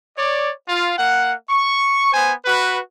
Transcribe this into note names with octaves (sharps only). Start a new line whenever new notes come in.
C#5 D5
F4
A#3 F#5
C#6
B3 C5 G#5
F#4 B4